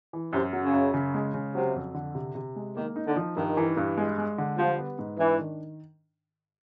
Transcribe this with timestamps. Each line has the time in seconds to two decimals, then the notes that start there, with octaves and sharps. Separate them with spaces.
0.13 E3
0.33 F#2 C3
0.53 F#3
0.63 C#3
0.74 F#2
0.94 C#3
1.14 G#3
1.34 C#3
1.55 C3 F#3
1.75 F2
1.95 D3
2.15 C3
2.35 C3
2.56 G#3
2.77 D#3 A#3
2.96 D#4
3.06 D3
3.16 F3
3.37 G2 D#3
3.57 E3
3.77 G2
3.97 G#3
4.18 G#3
4.38 D3
4.58 F3 G3
4.78 B3
4.99 G#2
5.19 E3 D4
5.38 D#3